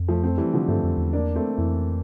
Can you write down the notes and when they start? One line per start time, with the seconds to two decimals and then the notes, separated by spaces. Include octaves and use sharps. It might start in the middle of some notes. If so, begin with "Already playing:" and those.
Already playing: F2
0.08 F3 A3
0.23 A3 C4
0.37 E3 G3
0.54 D3 F3
0.68 G2 A3 C4
0.83 F2
0.97 E2
1.13 A#3 D4
1.35 A3 C4
1.57 F2 E3